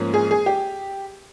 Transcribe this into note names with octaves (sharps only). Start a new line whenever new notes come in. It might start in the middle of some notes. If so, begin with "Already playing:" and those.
Already playing: G#2 F3 A#3 C#4
G#4
G#4
G4